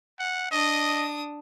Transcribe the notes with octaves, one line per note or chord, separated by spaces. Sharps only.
F#5
D4 D#5 D#6